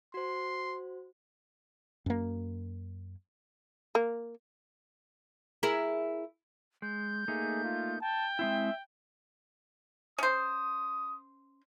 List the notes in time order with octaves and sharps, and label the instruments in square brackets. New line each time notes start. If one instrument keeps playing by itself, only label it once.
[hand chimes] F#4 C5 [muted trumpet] C6
[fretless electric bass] F#2 A#3
[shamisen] A#3
[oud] E4 G#4 A#4
[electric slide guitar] G#3 [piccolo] G6
[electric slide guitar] A3 A#3 D#4 [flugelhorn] G#4
[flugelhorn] F4
[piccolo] G5 [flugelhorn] A5
[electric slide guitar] G#3 C4 E4 [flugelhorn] E5
[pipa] C#4 C5 [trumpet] D#6